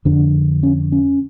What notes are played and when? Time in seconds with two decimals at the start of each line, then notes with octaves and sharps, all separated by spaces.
0.05 F2 D3 D4
0.63 C#4
0.92 C#4